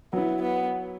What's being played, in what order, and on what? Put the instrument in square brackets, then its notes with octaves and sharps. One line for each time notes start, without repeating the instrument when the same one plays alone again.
[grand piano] F#3 E4 [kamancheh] B3
[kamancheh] B3